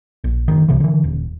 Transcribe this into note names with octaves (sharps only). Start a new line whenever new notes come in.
A#1
F#1 D#3
C2 C3 E3
D3 E3
D#1